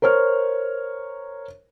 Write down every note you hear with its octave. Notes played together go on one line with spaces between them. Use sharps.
A#4 C5 C#5 F6